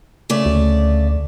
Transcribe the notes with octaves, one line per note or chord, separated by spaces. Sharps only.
C#3 A3 D5
D2